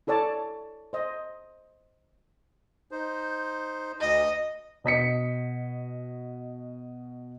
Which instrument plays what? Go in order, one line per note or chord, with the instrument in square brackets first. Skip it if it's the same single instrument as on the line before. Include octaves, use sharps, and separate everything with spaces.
[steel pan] E4 A4 C#5 D5 A5
C5 D#5
[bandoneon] D#4 C5
[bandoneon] D2 [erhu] D#5
[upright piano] B2 D#5 B6 C#7